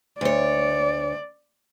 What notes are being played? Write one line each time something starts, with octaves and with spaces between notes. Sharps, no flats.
D2 C#5 D5